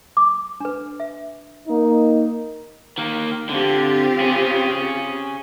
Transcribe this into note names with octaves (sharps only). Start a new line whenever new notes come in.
D6
D4 B4
E5
A#3 D#4
D#3 A#3
D3 C4 F4 G4
C#4 G#4